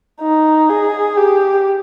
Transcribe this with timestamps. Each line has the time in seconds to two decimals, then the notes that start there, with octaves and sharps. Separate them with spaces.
0.21 D#4
0.69 G#4
1.17 G4